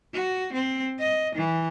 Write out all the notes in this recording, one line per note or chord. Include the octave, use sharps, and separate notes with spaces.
F#4
C4
D#5
E3